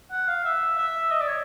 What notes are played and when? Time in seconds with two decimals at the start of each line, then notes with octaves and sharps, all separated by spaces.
0.11 F#5
0.28 F5
0.45 E5
0.78 E5
1.11 D#5
1.20 D5
1.28 C#5